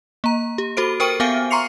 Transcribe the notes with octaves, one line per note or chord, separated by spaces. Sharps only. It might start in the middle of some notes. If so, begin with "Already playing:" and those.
A#3 A#5
G4
F#4 A4 C5 D7
A#4 C5 G5 C#6 D7 D#7
B3 E5 F5 G#5 F6
A#5 C6 C#6 C7 C#7 F7